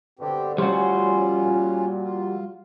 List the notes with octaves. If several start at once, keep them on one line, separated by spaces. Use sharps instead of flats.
G2 B2 D3 C4 G4
G3 C#4 F4 F#4 C5 C#5 C6
A#2
F4